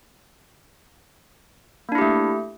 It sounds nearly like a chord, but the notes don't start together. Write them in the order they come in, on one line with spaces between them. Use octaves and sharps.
A#3 D4 E4 G4 A3